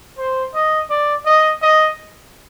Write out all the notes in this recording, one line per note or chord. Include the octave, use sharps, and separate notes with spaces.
C5
D#5
D5
D#5
D#5